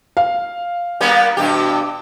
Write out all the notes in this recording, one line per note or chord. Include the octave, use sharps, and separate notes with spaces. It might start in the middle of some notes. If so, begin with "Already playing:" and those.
F5
G3 A#3 B3
G2 B2 G4